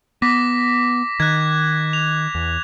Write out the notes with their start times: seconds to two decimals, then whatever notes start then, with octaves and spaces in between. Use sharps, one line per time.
0.22 B3 D6 A#6 B6
1.20 D#3 F#6 G#6
1.93 F7
2.35 E2